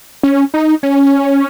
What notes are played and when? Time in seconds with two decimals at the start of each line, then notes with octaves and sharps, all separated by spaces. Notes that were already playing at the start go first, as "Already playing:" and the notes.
0.23 C#4
0.54 D#4
0.83 C#4